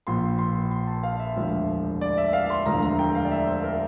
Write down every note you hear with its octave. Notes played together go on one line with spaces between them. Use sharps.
A#1 A#2 F3 C6
C6
C6
A5
F5
E5
E1 D2 D3 F3
D5
E5
F5
C6
E1 D2 D3 F3 A#5
A#5
G5
F5
D5
E5
C5
A#4